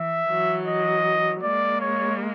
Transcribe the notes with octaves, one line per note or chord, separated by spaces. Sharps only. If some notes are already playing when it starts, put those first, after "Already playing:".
Already playing: E3 E5
E3 F#3
D#5
G#3 A#3 D5
C#5